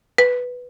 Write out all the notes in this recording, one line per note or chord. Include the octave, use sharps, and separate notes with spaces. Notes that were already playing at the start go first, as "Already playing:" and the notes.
B4